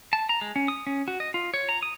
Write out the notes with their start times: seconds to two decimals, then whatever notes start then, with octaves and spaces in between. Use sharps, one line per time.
0.13 A5
0.29 A#5
0.41 G#3
0.56 C#4
0.68 D#6
0.87 C#4
1.08 F#4
1.20 D#5
1.34 F4
1.54 C#5
1.69 A#5
1.83 D#6